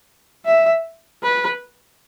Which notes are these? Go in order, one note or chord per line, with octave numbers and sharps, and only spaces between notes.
E5
B4